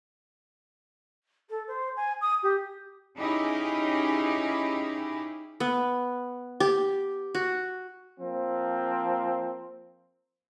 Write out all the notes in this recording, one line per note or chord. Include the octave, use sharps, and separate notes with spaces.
A4
C5
G#5
D#6
G4
C#4 D#4 E4 G4 G#4
B3
G4
F#4
F3 A#3 C4